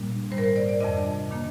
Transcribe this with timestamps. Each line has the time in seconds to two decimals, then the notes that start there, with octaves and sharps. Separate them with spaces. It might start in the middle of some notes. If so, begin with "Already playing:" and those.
Already playing: A#2 G3 A#3 D4
0.31 G#2 D#3 G3 A#3 C5
0.38 A#4
0.44 C5
0.56 D5
0.69 D5
0.80 F2 C3 G3 D4 D#5
1.31 D#3 A#3 D4